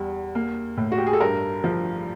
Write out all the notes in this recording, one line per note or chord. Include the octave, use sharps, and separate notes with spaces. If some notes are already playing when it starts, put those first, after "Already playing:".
Already playing: E2 G3
A#3
A2
F#4
G4
G#4
A4
G2 A#4
F3